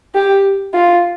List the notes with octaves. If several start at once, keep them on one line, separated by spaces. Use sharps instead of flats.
G4
F4